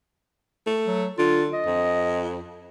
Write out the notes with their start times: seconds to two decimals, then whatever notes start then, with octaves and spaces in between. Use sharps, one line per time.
0.67 A3
0.87 F#3
1.18 D3 F4
1.53 D#5
1.66 F2